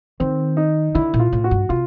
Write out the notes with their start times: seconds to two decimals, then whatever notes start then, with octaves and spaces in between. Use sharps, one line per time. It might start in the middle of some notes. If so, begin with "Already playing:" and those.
0.20 D#3 C4
0.57 D#4
0.95 D3 E4
1.14 A#2
1.19 F4
1.33 A2
1.44 F#4
1.51 G2
1.69 C3 F4